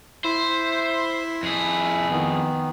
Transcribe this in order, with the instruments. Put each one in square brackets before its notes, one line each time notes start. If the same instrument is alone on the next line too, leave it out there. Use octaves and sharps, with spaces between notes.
[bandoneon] E4 E5 [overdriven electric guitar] C5
[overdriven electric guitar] F2 G#4
[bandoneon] D#3 B3